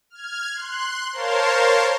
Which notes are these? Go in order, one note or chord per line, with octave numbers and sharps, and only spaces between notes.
F6 G#6
C6 F#6
A#4 C5 C#5 F5 A5 C6